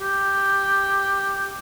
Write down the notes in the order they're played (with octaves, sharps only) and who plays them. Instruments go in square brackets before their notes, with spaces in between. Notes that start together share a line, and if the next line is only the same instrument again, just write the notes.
[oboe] G4